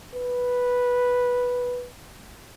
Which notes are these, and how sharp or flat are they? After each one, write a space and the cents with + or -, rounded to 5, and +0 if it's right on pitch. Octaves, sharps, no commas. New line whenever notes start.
B4 -5